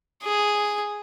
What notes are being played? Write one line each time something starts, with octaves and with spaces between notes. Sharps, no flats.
G#4